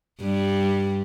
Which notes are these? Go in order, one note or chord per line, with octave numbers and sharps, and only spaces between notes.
G2 G3